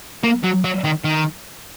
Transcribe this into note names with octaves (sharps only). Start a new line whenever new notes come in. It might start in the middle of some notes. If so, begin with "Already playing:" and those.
A#3
F#3
F#3
D#3
D#3